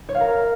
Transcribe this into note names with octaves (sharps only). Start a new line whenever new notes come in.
C#5
F5
A#4